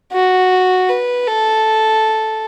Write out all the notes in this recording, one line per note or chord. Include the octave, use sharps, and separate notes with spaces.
F#4
B4
A4